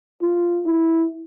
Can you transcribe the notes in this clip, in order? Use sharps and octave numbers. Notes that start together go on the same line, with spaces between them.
F4
E4